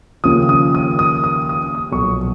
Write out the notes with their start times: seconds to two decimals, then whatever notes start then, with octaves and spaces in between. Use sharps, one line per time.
0.24 D#2 C#3 F3 D#6
0.49 D#6
0.75 D#6
0.99 D#6
1.24 D#6
1.49 D#6
1.75 D#6
1.92 B1 A#2 F3 C#6